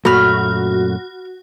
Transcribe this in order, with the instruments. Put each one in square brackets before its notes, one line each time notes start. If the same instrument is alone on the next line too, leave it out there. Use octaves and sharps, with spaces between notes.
[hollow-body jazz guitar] F#2 A#2 A3 [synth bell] F#4 [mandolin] B5 F6